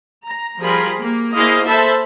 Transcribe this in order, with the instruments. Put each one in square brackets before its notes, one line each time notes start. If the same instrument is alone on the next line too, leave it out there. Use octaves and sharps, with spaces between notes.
[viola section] A#5
F3 G3 F4 G#4 A#4 B5
A#3
A#3 E4 G#4 C5 D#5 F5
A4 C5 E5 A5 B5